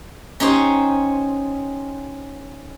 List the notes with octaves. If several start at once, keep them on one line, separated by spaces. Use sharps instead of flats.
C#4 D#4 G4 C5